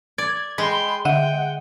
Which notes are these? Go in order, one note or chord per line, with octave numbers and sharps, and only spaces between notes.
D5 G#6
G#3 G5 B5 C6
D3 E5 F#5 G5 D#7